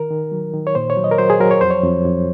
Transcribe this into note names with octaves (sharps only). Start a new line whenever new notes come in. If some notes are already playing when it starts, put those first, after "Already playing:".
Already playing: D#3 A#4
D#3
F#3
D#3
C#5
A#2 C5
C#5
F#3
D#5
A#4
F#3 C5
G#4
F#3 A#4
C#5
F2 C5
C#5
F2
F2